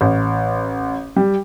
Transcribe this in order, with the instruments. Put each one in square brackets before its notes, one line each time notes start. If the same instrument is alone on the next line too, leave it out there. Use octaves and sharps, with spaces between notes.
[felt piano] A1
G3